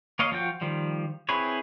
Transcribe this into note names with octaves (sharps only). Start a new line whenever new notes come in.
A#3 A#4 C#5 D#5 F5
F3 F4 F#4 G5
D#3 F3 G3
C4 E4 G#4 B4 C#5